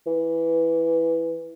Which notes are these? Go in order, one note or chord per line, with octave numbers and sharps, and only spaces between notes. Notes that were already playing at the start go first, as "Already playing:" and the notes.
E3